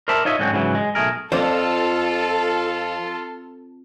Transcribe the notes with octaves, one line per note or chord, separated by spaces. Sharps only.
A#4 C5 D5 E5 A5 B5
D#4 F4 C#5 D#5 E5
G#2 D3 F#3 C4 C#4
G#2 C#3 E3 F#3
G#3
B1 A3 G#4 A#4
F2 F4 A4 C5 D5